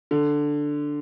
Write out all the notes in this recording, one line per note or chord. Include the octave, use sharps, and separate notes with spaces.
D3